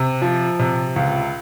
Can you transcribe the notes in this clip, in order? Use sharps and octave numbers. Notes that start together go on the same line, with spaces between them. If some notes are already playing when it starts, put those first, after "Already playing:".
Already playing: C3
F3
C3
C#2